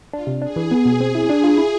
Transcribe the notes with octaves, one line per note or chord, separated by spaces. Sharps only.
D4 F4
C3
D4 G#4
E3
B3 G#4
B2
C4
E4
D4 G#4
F4
E4